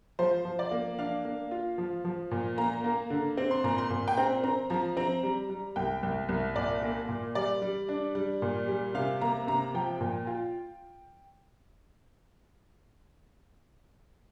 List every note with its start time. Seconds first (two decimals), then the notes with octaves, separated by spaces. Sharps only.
0.19 F3 C5
0.45 F3
0.59 D5
0.71 A#3
0.98 D4 F5
1.25 A#3
1.51 F4
1.78 F3
2.05 F3
2.31 A#2
2.58 A#3 A#5
2.84 A#3
3.10 D3
3.37 C4
3.51 C6
3.64 A#2 A#5
3.78 C6
3.90 A#2
4.08 G5
4.17 C4 A#5
4.44 C4 A#5
4.70 F3 A#5
4.97 C4 A#5
5.23 G3
5.50 G3
5.76 C2 G5
6.03 C2
6.29 C2
6.56 A#2 D5
6.83 A#3
7.09 A#2
7.35 G3 D5
7.62 G3
7.89 D4
8.15 G3
8.42 A#2
8.68 G3
8.94 C3 F5
9.21 A#3 A#5
9.47 C3 A#5
9.74 F3 G5
10.01 A#2
10.27 F4